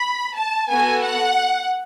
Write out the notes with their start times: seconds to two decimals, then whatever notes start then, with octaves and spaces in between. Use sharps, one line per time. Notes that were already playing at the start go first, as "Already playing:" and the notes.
Already playing: B5
0.37 A5
0.70 B3 F#4 A4 G#5
1.04 F#5